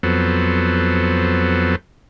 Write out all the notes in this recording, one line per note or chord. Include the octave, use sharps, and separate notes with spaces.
F2 F#3 B3 A4 C5